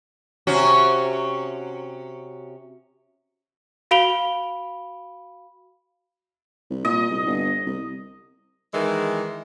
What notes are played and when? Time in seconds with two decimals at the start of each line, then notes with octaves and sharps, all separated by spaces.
0.47 C3 C#4 F#4
3.91 F#4 F5 B5 D7 F7 G7
6.70 C2
6.85 A#2 D#5
7.10 C2
7.26 G1
7.66 C2
8.74 D#3 E3 G#3